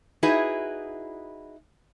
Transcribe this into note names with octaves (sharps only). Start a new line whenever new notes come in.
D#4 E4 F#4 G#4 B4